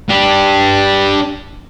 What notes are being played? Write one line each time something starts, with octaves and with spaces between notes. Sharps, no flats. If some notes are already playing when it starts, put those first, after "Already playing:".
D4 G4